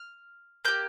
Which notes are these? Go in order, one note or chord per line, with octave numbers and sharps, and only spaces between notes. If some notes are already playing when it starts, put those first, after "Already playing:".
Already playing: F6
A#3 G4 G6